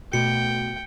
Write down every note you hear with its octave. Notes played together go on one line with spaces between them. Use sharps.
B2 A3 F#4 G5 C#7